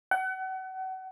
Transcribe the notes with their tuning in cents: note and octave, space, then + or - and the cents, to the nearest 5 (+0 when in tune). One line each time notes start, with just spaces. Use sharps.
F#5 +35